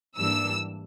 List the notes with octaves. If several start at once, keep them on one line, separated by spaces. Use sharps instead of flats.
G#2 E3 G3 A#3 D4 E6